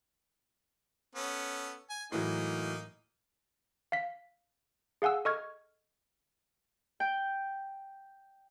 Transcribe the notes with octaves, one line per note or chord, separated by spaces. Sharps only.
B3 C#4 A4
G#5
A2 E3 F#3 A#3 D#4
F5 B6
G#4 F5 F#5 G#5 E6
A4 D#5 C#6 F6 G#6
G5